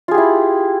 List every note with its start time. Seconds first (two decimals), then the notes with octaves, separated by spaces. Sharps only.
0.08 F4
0.11 G#4
0.14 G4
0.18 E4